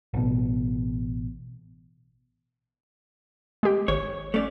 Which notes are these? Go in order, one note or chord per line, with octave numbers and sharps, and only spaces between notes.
A1 B2
G#3 G4
G#1 C#5
A3 C#4 D5